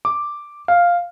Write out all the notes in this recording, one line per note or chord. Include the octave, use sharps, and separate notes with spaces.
D6
F5